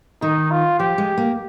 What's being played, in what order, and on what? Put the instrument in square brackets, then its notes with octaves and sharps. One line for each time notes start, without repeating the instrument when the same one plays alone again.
[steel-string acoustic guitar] D#3 [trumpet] D#4
[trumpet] F4
[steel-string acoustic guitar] F3 [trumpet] G4
[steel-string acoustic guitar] G#3
A#3